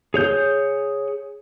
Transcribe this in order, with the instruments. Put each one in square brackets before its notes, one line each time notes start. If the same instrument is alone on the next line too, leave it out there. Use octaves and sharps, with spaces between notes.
[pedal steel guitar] G#4 C#5 G6